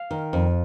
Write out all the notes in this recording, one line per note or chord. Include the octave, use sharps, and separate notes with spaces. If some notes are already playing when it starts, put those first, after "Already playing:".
Already playing: F5
D#3
F2